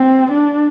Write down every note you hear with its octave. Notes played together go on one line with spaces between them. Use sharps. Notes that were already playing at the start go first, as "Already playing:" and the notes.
Already playing: C4
D4